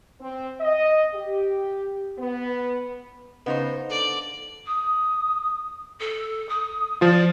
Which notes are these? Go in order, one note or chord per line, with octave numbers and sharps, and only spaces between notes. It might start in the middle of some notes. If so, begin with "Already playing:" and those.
C4
D#5
G4
B3
C#3 B3 D#4 C5
D3 D5
D#6
A4
D#6
F3 F4 D5